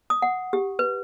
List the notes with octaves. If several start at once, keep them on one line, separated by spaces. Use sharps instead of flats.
D#6
F#5
G4
B4